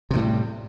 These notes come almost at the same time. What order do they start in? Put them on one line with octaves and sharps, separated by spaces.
C3 D#3 A2 G3